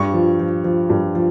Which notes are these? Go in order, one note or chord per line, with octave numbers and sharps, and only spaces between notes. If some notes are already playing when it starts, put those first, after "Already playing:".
Already playing: G2 C#6
F3
F3
F3
G2
F3